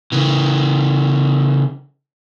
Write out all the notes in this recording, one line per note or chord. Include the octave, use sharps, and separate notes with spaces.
C#3 E3